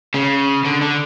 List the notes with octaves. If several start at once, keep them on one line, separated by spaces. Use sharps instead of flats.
C#3
D3
D3